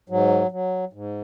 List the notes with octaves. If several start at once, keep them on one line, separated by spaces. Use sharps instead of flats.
G#2 F#3
F#3
G#2